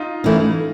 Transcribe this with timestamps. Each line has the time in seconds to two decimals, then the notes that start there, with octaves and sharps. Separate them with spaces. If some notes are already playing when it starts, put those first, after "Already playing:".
Already playing: D#4 F4
0.24 E3 A3 C#4